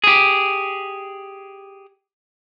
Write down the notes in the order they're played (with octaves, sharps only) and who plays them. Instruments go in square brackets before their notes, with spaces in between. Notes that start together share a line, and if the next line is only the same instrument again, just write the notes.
[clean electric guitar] G4 G#4